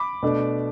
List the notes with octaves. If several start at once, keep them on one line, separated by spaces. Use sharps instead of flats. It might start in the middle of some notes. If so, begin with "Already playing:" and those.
Already playing: B5 D6
B2 A3 D4